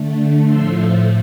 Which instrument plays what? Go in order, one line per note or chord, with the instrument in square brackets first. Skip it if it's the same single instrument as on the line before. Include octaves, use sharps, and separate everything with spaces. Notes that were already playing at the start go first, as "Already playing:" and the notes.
Already playing: [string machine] D3 A3
A2 F3 A3 C6 E6